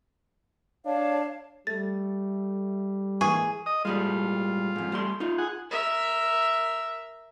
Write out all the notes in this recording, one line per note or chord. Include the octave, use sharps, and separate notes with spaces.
D4 C#5 F5 A5
G3 A3 A6
E3 G#3 A#3 G#4 C#6
D#5 D#6
A2 G3 G#3 F4
F2 G#2
G3 A3 C6
D#4 F4
G#4 F#5
A#4 E5